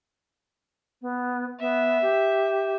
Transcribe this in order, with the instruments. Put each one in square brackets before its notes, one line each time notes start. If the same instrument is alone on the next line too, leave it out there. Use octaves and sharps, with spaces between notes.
[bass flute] B3
[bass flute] B3 [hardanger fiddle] E5
[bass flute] G4